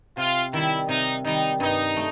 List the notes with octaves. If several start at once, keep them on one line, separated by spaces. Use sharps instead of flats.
C3 F4
D#3 G3 E4
C3 D#4
D#3 G3 D#4
G2 D#4
A3